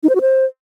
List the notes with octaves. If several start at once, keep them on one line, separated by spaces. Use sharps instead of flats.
D#4
C5
F#4
C5